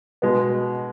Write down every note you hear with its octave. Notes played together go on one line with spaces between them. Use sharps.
B2 G#3 B3